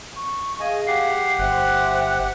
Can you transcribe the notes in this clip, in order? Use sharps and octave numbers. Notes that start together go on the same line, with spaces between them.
C#6
G#4 D#5 F5 G#5
G4 F#5 C7
G1 C5 E5 G5 F#6